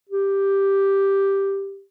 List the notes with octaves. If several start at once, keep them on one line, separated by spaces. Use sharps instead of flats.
G4